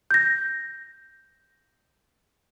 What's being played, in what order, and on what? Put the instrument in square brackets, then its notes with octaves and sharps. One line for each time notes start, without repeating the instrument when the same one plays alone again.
[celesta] G6 A#6